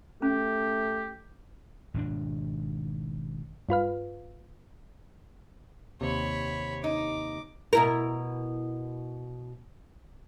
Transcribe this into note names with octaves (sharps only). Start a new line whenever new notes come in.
A3 C#4 G4
G#1 B2 D#3 D4
G2 F4 B4 F5
D#2 C3 C#5 B5
D#4 D6
B2 E4 A#4